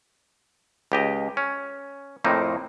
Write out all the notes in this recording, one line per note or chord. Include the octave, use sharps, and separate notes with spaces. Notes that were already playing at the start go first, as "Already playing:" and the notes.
C#2 G4 D#5
C#4
F2 A2 A#3 C4 D#4